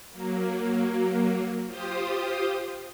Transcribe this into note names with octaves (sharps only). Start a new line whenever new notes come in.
F#3 A#3
F4 G4 C5 D#6